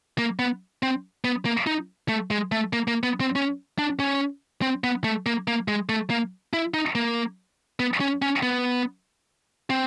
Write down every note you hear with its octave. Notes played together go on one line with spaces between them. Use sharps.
A#3
B3
C4
B3
A#3
D#4
A3
G#3
A3
A#3
A#3
B3
C4
C#4
D4
C#4
C4
B3
A3
A#3
A#3
G#3
A3
A#3
E4
D#4
A#3
B3
C#4
C#4
B3
C4